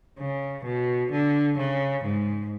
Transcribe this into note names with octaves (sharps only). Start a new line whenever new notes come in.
C#3
B2
D3
C#3
G#2